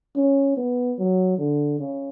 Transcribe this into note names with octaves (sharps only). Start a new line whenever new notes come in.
C#4
B3
F#3
D3
C#3